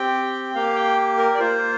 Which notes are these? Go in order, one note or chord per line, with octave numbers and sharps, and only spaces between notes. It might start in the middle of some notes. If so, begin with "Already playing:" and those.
Already playing: C4 G4 G5
A#3 G4 F5
G5
A#4
D5
A#3 F4 C5